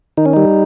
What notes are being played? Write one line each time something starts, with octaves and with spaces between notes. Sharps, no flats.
D#3 D#4
C#4
G3 D#4